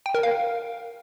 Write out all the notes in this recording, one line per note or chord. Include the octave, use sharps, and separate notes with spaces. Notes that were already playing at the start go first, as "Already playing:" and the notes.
G5
A#4
F5